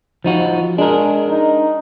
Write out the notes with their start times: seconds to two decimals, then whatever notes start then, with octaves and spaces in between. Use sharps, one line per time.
0.24 F3 D#4 F#4
0.78 G#3 D4 A#4
1.30 D#4